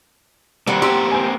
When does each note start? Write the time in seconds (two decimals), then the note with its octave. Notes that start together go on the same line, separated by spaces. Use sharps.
0.67 D#3 G3 A#3 C4 F#5
0.82 G4 C6 E6
1.12 C5 G#5